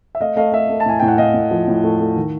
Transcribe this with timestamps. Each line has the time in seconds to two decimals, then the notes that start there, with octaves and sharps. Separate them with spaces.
0.15 E5
0.21 A3 D#5 F5
0.36 A3 D#5 F5
0.52 A3 E5
0.69 A3
0.80 A5
0.86 A2 G#5
0.99 A2 G5
1.08 F#5
1.18 A2 D#5 F5
1.34 A2
1.51 F3
1.68 A2
1.84 A3
1.99 A3
2.16 D#3